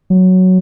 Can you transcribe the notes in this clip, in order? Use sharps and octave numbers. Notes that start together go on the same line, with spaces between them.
F#3